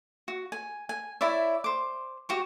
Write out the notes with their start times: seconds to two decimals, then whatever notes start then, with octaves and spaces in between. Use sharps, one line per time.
0.28 F#4
0.52 G#5
0.89 G#5
1.21 E4 C#5 D5 E5
1.64 C5 D6
2.29 F#4 G4 C#6